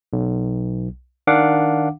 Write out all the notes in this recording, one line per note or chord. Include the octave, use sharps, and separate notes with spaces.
B1
D#3 D4 F5 F#5 D6